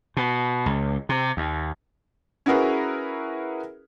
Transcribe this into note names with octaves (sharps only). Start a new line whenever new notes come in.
B2
C#2
C3
D#2
C#4 E4 F#4 G#4 A#4 B4